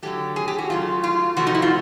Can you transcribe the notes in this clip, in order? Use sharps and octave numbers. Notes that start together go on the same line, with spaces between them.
D3 F#3 A3 G4
G#4
G4
F#4
C#3 F#3 A3 F4
F4
C3 F3 A3 F#4
D#4
E4
F4